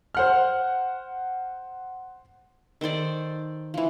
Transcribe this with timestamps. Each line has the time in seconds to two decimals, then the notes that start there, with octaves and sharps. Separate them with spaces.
0.15 C5 F#5 F6
2.81 D#3 A4 C5 D5
3.74 E3 F3